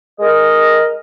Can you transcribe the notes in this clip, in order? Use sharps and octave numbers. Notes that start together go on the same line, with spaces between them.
G#3 A#4 D#5